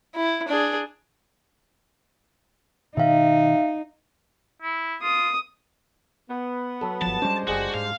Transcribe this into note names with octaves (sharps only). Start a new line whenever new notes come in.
E4
D4 G#4
B2 D#3 D#4 E5 F5
E4
F4 D#6
B3
F#3 A4
G1 F3 A5
G3 G#3 C#4 D4 C5
F#1 G3 F#4 G#4
G#2 F5